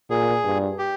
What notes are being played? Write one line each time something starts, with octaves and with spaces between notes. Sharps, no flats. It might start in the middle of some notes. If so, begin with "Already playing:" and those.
A#2 G#4
G2
G4